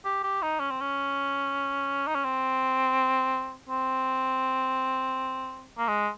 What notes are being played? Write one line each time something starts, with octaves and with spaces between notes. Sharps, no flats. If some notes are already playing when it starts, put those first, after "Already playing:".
G4
G4
D#4
C#4
C4
C#4
D#4
C#4
C4
C4
A#3
G#3